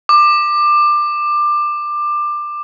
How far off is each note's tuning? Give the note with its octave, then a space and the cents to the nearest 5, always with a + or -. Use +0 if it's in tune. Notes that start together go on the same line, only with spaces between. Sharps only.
D6 +20